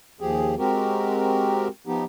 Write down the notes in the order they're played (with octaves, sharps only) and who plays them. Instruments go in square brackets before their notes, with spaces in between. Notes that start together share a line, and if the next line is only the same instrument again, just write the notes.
[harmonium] D#2 F3 G4 G#4
G#3 C4 F#4 G4 A#4
F3 B3 D#4 G4